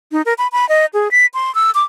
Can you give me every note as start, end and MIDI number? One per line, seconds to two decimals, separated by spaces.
0.12 0.22 63
0.26 0.34 70
0.38 0.48 83
0.52 0.68 83
0.69 0.86 75
0.94 1.11 68
1.11 1.26 95
1.34 1.54 84
1.55 1.71 88
1.75 1.84 86